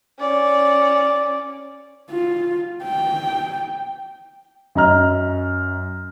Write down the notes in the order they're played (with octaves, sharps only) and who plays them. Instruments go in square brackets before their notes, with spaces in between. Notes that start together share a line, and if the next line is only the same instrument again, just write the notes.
[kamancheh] C#4 D5
[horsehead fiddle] F4
G5
[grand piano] F#2 D#5 A#5 F6